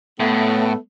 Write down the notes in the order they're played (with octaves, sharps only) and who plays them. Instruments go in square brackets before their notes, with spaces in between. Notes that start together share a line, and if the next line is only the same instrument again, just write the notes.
[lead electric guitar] A2 [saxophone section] A3 B3